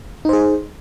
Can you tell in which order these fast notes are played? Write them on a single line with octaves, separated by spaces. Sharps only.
D#4 C5 G#4